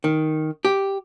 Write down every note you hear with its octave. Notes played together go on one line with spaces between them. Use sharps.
D#3
G4